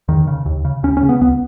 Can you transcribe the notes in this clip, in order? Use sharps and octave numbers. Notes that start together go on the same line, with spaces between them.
E2 D#3
C#3
D#2
C#3
D#2 C#4
C#4
C#3
B3
C#2 B3